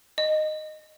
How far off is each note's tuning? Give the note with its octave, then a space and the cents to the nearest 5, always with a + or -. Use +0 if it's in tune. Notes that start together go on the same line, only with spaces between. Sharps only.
D#5 -10